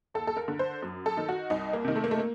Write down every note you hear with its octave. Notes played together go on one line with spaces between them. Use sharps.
D#2 A4
A4
A#4
D3
C5
F#2
A4
D#3
F#4
C2 D#4
A#3
C3 D#3
A3
A#3
A3
A#3